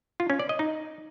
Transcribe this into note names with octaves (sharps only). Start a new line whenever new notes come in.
F4
C#4
D5
D#5
D#4